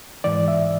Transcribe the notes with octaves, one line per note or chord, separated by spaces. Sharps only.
G#2 E3 D5
E5